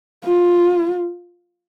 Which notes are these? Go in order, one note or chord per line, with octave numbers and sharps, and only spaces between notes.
F4